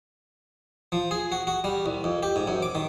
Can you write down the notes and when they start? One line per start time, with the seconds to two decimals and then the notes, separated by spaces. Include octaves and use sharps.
0.92 F3
1.11 G#4
1.32 F#4
1.47 F#4
1.64 G3
1.86 C2
2.04 F2
2.23 G4
2.36 G#2
2.48 F#2
2.63 D6
2.75 D#3